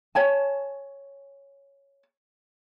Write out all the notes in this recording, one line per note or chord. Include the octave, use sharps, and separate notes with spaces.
C#5 G#5 A5